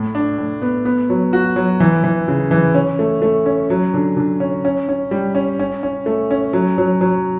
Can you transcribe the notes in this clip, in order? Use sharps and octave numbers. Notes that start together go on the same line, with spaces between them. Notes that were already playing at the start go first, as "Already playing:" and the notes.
Already playing: A2
D4
A2
B3
B3
F#3
F#4
F#3
E3
E3
C#3
E3
C#4
A3
A3
C#4
F#3
D3
D3
C#4
C#4
C#4
G3
C#4
C#4
C#4
A3
C#4
F#3
F#3
F#3